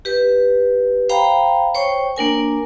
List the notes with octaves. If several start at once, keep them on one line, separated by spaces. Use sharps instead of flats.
G4 B4
C5 F5 G5 A#5 B5
C5 C#5 G5 C#6
A#3 D4 A#4 G#5